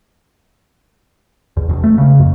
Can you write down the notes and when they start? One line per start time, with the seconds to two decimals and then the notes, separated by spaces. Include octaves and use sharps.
1.57 E2
1.69 E1
1.84 A3
1.98 C#3
2.19 F2